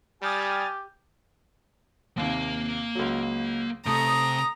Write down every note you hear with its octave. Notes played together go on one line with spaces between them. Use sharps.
G3 G4 G#5 D#6 F6 A6
D#2 C3 A#3 F5
C#2 F#3
C3 A3 A#5 D#6